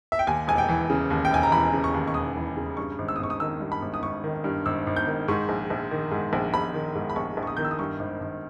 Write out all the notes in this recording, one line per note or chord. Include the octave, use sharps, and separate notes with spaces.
E5
G5
D#2 G#5
E1 G#5
G5
E3
C#3
D#2
G5
E1 G#5
A#5
E3 B5
C#3
C#6
D#2
C#6
E1 D#6
E3
C#3
G2 C#6
G#1
E6
D#6
G#1 C#6
D#6
D#3 E6
G2
B5
G#1
D#6
G#1 C#6
D#3
G2
G#1 E6
G#1
G6
D#3
G#2 C#6
A#1
A#1
D#3
G#2
A#1
A#1 B5
D#3
G#2
B5
A#1 C#6
A#1
C#6
D#6
D#3 G6
E6
D#6
G2 C#6
G#1
G#1